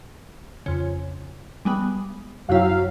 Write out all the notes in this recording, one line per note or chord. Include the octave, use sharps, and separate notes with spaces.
F2 C#3
G3 G#3 B3
F#2 C3 F#3 E4 F5